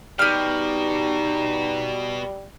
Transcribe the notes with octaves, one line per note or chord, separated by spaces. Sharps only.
B2 G3 D#4 G4 F6